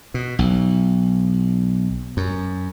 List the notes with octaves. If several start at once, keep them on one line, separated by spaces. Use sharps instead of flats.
B2
B1
F#2